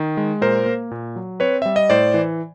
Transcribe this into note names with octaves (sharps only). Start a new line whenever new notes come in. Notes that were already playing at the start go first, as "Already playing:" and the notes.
Already playing: D#3
G#3
A#2 A#4 C5
A#3
A#2
F#3
C4 B4 C#5
G3 E5
D#5
A2 C5 D5
E3